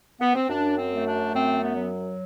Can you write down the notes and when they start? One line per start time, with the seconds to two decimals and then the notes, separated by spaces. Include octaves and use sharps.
0.21 B3
0.35 C4
0.49 F#2 D4
0.78 C4
0.91 A3
1.06 D4
1.34 F#2 C4
1.62 B3
1.77 F#3